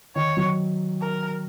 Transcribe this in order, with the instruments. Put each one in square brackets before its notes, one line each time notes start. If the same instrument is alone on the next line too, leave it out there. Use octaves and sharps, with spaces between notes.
[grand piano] D#3 [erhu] C#5
[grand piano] F#3
[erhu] A#4